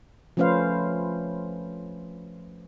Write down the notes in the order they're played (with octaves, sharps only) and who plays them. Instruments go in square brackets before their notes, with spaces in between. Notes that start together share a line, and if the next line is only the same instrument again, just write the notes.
[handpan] F3 A3 C#4 B4 C5 F5